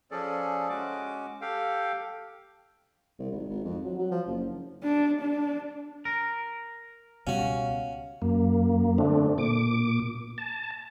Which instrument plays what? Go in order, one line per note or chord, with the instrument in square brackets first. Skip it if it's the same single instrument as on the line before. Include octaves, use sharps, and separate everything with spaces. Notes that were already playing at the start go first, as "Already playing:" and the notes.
[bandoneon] F3 C#4 G#4 A4 D5
G#3 C#4 F#4 D6
G4 A4 F5 G5
[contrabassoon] C2
G#1
G#1
F2
F#3
F#3
F3
F#1
[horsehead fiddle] D4
D4
[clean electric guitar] A#4
[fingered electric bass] C#2 B2 G3 [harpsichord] C#4 F#4 [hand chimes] F5
[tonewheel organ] F#2 A#3
D3 A3 C4 D4
A#2 D6
A5